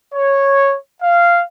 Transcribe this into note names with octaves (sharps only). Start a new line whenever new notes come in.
C#5
F5